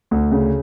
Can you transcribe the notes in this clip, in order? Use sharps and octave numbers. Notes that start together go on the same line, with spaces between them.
D2
C#3